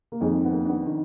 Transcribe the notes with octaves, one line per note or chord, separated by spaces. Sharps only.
A#3
F2 D#3 G#3
B3
A#3
D4
B3
D#3 D4